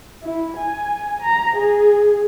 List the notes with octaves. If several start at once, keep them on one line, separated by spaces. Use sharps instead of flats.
E4
G#5
A#5
G#4